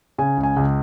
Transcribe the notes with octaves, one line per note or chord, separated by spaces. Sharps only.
C#3 G#5
C#2
G#5
C#2